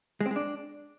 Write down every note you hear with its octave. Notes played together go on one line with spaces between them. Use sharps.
G#3
C4
G#3
D4